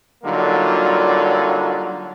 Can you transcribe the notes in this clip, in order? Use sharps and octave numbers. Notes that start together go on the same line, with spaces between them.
D3 F#3 G3 A#3 D#4 F4